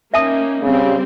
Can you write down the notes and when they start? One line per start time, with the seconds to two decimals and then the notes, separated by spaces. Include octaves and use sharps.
0.14 A#3 C#4 D#4 E5 A5 D#6
0.63 C#3 G3 C4